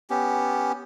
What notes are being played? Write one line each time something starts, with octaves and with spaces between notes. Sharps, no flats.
B3 C#4 G4